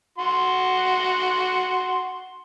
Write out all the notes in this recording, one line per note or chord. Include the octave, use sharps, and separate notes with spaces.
F#4 C6